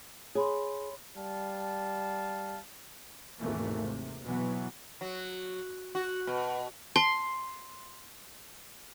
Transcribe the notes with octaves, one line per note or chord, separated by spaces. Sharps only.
G#4 C#5 B5 C6
G3 F5 A5
G#1 D#2 B2 E3 A3 A#3
C3
B2 E3 F#3 B3
F#3
F#4
B2
A5 C6